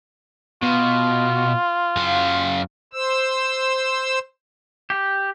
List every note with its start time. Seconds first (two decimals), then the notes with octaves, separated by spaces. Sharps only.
0.63 B2 F4
1.97 F#2 F5
2.93 C5 E6
4.90 G4